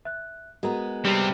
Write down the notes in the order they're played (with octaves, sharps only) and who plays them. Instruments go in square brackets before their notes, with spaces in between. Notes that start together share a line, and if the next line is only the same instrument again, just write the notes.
[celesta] E5 F#6
[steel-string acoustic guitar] G#3 B3 [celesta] F#4 A#4 A#5
[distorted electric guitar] C3 C4 [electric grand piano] G3